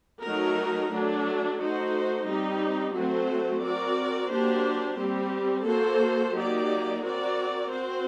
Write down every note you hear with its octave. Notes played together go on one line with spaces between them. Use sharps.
F#3 A3 D#4 F#4 A#4
F#3 A3 D4
A3 D#4 F#4 C5
G3 C4 D#4 G4
F#3 A3 C4 F#4 C5
C4 F#4 A#4 D5
F#3 A#3 D4 G4 C5
G3 C4 G4
A#3 F#4 A4 C5
F#3 A#3 D#4 G4 D5
C4 F#4 A#4 D5
C4 F#4 C5